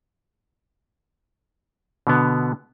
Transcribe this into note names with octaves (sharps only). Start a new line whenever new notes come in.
B2 D3 B3